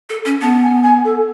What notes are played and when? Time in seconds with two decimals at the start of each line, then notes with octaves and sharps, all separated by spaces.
0.10 A4
0.25 C#4
0.41 B3 A5
0.63 G#5
0.83 G#5
1.05 A4